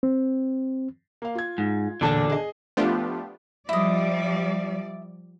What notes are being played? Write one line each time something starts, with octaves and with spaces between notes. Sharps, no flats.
C4
A#3 F5
F4 G#6
G#2
E1 A#2 D3 D4 A5
G#4 D#5
F3 A3 B3 D4 F4 G4
F3 G3 E4 D5 D#5